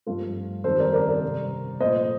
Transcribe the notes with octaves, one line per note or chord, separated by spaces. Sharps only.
G2 F3 A3 F4 A4
F2 D#3 G3 A4 C5
A#4 D5
A#4 D5
A#4 D5
C3 G3
A#2 F3 A3 C5 D#5